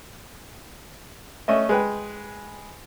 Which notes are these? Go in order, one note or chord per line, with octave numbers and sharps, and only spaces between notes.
A3 C#4 D#5 E5
G#3 B4 G5